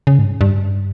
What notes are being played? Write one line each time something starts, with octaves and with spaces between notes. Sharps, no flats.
C#3
G#2
G2
G2